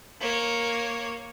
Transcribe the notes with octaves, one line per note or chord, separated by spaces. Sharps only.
A#3 C#5